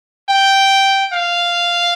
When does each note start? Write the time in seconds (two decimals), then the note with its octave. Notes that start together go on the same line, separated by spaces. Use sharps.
0.29 G5
1.13 F5